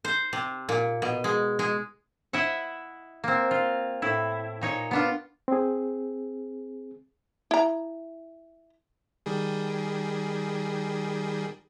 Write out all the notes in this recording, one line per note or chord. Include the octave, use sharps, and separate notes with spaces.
C5
C3
A#2
B2
G#3
G#3
E4 D#5 E5 F#5
A#3 C4
F4
A2 E4
A#2 D#4 C#5
B3 D4 F4
C4 G#4
E4 A#5
D#3 G3 G#4